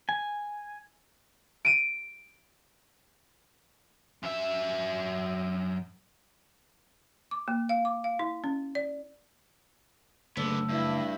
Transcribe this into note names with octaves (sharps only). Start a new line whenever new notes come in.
G#5
D7 D#7
F#2 E5
D6
A#3
F5
D6
F5
E4
C#4
D5
F#1 D3 A3 B3 E6
G2 E4